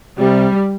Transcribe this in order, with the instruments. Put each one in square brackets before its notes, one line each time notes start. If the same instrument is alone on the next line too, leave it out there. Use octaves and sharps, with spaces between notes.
[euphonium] C3 [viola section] G3